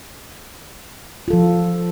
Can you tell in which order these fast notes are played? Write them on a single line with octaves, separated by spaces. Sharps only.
F4 A4 F3